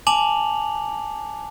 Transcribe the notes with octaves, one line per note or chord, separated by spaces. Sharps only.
G#5 A5 D6 F7 F#7